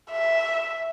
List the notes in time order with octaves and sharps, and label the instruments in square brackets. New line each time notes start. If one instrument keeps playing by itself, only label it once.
[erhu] E5